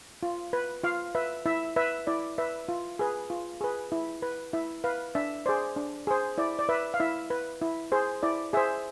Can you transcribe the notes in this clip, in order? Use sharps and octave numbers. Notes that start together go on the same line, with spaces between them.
F4
B4
F4 F5
B4 E5
E4 E5
B4 E5
E4 D5
B4 E5
F4
G#4 B4
F4
G#4 B4
E4
B4
E4 E5
B4 F5
D4 E5
G#4 C5 D5
D4
G#4 C5
E4 D5
D5
B4 E5
F5
E4 E5
B4
E4
G#4 C5
E4 D5
G#4 C5 E5